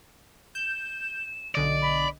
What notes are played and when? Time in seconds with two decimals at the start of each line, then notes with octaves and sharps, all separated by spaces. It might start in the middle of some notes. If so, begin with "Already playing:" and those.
0.55 G6 E7
1.55 B1 D3 D5 D#5
1.82 B5